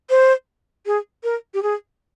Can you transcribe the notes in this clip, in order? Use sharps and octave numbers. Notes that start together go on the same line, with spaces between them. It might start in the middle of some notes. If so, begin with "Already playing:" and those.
C5
G#4
A#4
G4
G#4